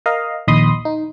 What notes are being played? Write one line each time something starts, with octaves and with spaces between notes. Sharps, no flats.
A#4 D#5 F5
A#1 D#2 D#5 B5 C6 D#6
D#4